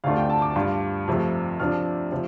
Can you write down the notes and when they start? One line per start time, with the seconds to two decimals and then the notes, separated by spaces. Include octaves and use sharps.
0.04 D2 C3 A3 D4 F4 F5
0.17 G5
0.30 A5
0.42 D6
0.56 G2 G3 F4
1.08 F2 C3 F3 A3
1.60 C3 F3 D4 F6
2.12 C3 F3